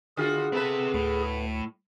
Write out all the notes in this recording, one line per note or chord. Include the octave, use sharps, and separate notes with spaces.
D3 F4 F#4 G#4
B3 C4 A4 B4 E5
D2 A2